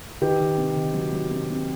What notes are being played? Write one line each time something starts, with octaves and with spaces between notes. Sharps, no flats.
D#3 G4 B4
D#3
C3
D#3
F#3
F#3
C3
C3